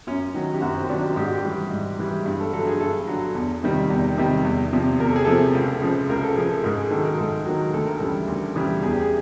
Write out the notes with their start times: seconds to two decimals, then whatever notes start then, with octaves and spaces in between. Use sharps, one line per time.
0.07 F#2 C#4
0.34 D#3 F#3
0.54 G4
0.61 F#2 F#4
0.76 C4
0.89 D#3 F#3 D4
1.03 G4
1.16 G#2 G4
1.25 F#4
1.31 G4
1.44 E3 G3
1.71 G#2
1.99 E3 G3
2.26 G2
2.40 A4
2.53 D3 F#3 A4
2.67 G#4
2.80 G2 A4
3.07 D3 F#3
3.35 E2
3.63 C3 D#3 G3
3.90 E2
4.18 C3 D#3 G3
4.45 E2
4.73 C3 F3
5.00 E2 A#4
5.07 A4
5.16 G#4
5.25 C3 F3 A4
5.55 C#2
5.81 C#3 F3
6.09 C#2 A#4
6.23 A4
6.36 C#3 F3 G#4
6.51 A4
6.64 G#2 A#4
6.77 G#4
6.91 D#3 A4
6.95 F#3
7.05 A#4
7.18 G#2 A4
7.46 D#3 F#3
7.74 D2 A4
7.86 A#4
7.98 C#3 E3 G3 A4
8.28 D2
8.56 C#3 E3 G3
8.83 E2 G#4
8.92 G4
9.01 G#4